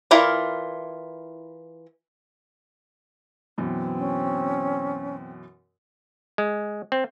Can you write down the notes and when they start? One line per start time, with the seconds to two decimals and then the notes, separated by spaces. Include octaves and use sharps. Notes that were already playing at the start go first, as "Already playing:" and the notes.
0.11 E3 E4 F4 A#4 D5
3.58 F#2 B2 E3 C4
3.99 C#4
6.38 G#3
6.92 C4